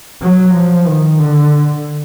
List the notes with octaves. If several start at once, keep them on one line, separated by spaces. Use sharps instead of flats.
F#3
F3
D#3
D3